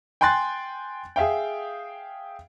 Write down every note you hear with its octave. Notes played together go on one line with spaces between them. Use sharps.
G5 G#5 C6 F#6 A6
G#4 E5 F5 G5